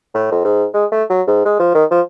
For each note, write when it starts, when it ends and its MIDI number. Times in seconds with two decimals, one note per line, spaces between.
0.14 0.27 45
0.31 0.42 41
0.45 0.66 44
0.74 0.85 56
0.92 1.03 57
1.10 1.22 54
1.27 1.43 44
1.45 1.59 56
1.60 1.70 53
1.74 1.85 51
1.91 2.01 53